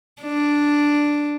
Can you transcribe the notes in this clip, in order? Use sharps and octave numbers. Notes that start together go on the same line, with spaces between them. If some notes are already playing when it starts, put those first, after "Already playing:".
D4